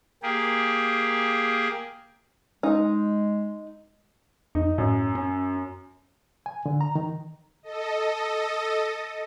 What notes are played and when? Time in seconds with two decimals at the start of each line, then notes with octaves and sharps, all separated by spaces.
0.23 A#3 G4 G#4
2.63 G#3 D#4
4.55 F2 D#4
4.78 F#2 A2
5.15 C#4
6.46 G#5
6.66 D3
6.81 A#5
6.95 D#3
7.63 A4 D#5